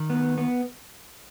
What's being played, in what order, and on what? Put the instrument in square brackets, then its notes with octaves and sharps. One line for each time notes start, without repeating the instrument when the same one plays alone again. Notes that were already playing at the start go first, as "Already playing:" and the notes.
Already playing: [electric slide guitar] D#3
B3
B3